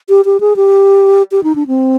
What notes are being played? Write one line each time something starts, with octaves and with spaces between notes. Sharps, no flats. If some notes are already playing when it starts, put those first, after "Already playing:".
G4
G4
G#4
G4
G4
D#4
D4
C4